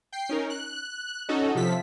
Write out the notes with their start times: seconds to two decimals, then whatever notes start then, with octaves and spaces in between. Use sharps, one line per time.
0.12 G5 C7
0.29 C#4 D#4 A#4
0.50 F#6
1.29 C#4 D#4 F#4 A4 D#5
1.55 C3 F3 A4 B6